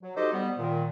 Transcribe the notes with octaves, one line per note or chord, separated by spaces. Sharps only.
F#3
D#4 F#4 G4 A4 C5 D#5
G3 B3
A#2 D#3